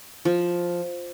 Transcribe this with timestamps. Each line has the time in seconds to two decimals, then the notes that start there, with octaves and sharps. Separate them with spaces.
0.25 F3